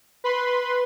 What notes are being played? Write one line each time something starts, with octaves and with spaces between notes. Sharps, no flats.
B4 B5 C6